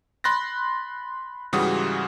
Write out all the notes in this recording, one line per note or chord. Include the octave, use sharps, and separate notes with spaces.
B5 C6 F#6 A6 A#6
G#2 C#3 E3 G3 F#4 D#6